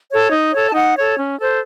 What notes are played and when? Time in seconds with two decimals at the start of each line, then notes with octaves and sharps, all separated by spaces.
0.10 A4 C#5
0.31 D#4
0.52 A4 C#5
0.69 A5
0.73 D#4 F#5
0.96 A4 C#5
1.16 C#4
1.38 A4 C5